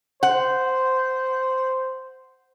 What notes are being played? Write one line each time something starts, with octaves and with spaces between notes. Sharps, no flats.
C5 F#5